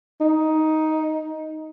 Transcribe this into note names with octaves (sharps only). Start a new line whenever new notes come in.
D#4